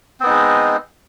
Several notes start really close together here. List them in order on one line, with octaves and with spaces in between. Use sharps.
C4 B3 D#4 G#3